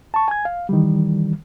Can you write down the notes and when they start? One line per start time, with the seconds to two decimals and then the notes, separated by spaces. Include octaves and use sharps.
0.14 A5 C#6
0.28 G#5 G#6
0.45 F5
0.69 D#3 E3 G3